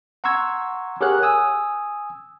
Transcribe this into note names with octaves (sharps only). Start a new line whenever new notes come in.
F#5 A#5 C6 C#6 E6 G#6
G4 G#4 A#4 C#5 F#5 F#6
G#5 D#6 E6